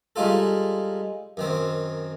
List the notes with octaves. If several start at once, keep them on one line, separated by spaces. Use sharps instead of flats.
G3 G#3 D#4 F4 A4
F#2 D#3 C4